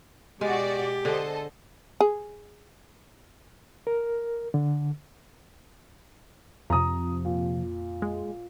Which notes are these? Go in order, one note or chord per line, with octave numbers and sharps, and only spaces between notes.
B2 G#3 F#4 G4 D5
D3 G#4 A4 C5 D#5
G#4
A#4
D3
F2 C3 F3 A#5 D#6
A#2
G#3